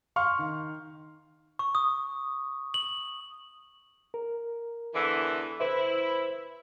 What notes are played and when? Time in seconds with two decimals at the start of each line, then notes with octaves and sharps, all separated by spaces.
0.16 F5 C6 C#6 F6
0.39 D#3
1.59 C#6
1.75 D#6
2.74 F#7
4.14 A#4
4.94 E2 D3 E3
5.60 E4 B4 C5 E5